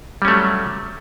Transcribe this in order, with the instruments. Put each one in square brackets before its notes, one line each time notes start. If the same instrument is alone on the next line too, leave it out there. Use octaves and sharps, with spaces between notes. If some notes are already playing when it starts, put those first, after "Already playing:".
[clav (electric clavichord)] G3
C#4
A3
F#3